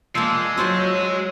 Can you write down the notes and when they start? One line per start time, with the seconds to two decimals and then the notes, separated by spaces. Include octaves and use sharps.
0.15 F3 G#3 A#3 E6
0.57 F#3 F4 F#4 C5